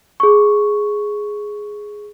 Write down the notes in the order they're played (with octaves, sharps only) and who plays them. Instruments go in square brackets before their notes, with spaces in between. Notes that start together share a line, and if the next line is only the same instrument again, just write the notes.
[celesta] G#4 C#6